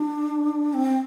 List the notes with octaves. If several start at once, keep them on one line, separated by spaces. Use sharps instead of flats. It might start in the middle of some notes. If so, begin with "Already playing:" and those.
Already playing: D4
C4